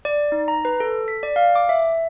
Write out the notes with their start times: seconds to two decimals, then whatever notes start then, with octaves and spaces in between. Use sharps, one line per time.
0.05 D5
0.32 D#4
0.48 A#5
0.65 B4
0.80 A4
1.08 B6
1.23 D5
1.36 F5
1.55 D6
1.69 E5